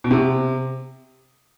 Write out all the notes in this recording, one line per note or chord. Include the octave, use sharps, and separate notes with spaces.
B2
C3